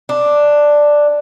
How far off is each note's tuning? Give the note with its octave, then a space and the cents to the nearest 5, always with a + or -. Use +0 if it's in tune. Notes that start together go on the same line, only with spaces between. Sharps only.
D4 +5